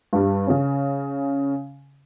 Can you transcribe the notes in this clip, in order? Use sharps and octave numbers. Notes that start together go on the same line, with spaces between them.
G2 G3
C#3 C#4